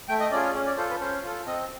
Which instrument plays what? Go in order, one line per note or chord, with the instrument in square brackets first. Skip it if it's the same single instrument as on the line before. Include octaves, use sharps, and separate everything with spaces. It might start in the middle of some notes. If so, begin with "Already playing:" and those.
[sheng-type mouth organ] A3 G5
D#5
C#4 D5
F4 G#4
C#5
C#4
D5
F4 A4 C5
B4
C#4 C5
F4 A4
C4 D#5